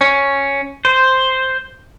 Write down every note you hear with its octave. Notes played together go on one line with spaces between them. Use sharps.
C#4
C5